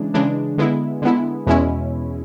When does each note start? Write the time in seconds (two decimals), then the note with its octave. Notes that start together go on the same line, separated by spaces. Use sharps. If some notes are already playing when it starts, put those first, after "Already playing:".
Already playing: C#3 E3 G#3 D4
0.14 C#3 E3 G#3 D4
0.58 D3 G#3 B3 E4
1.02 D3 G#3 B3 E4
1.46 E2 B2 G#3 C#4 E4